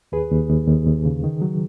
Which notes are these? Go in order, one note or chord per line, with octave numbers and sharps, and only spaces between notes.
D#2 G#4 B4
D#2
D#2
D#2
D#2
C#3
D#3
F#3